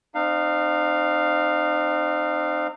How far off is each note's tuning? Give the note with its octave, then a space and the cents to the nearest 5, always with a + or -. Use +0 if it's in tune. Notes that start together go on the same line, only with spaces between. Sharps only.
C4 +0 D#4 -40 F5 +0